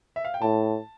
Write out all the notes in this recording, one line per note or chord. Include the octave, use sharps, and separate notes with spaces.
E5
F5
G5
A2 A5